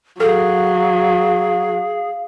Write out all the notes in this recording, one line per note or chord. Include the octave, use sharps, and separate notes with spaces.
F#3 G#4 A4 F5